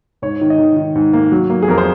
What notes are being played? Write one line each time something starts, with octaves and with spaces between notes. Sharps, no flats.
G#2 C#5
D#3
D#5
D#3
D#3
G#2
A#3
F#3
A#3
G#4
F2 A#4
C5